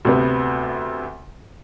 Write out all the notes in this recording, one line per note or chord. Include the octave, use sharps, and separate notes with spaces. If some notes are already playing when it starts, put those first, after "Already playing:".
D2 C3 B3